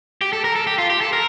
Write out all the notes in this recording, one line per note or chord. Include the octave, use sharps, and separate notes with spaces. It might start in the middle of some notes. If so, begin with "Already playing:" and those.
G4
A4
A#4
A4
G4
F4
G4
A4
A#4